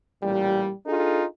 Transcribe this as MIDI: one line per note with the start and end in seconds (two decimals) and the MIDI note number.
0.23 0.71 33
0.23 0.71 46
0.23 0.71 55
0.86 1.25 62
0.86 1.25 63
0.86 1.25 65
0.86 1.25 68
0.86 1.25 69